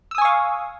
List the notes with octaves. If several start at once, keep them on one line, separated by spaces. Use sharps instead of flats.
F5 G#5 C#6 D#6 E6